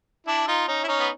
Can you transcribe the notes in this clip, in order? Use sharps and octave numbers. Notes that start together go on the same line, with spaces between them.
D4 E4
D#4 F4
C#4 D#4
E4
C#4 D#4
B3